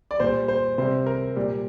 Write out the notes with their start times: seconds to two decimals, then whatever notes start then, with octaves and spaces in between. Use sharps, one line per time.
0.11 D5
0.20 A#2 G3 C5
0.48 C5
0.78 C3 G3 C5
1.06 A#4
1.36 A#2 G3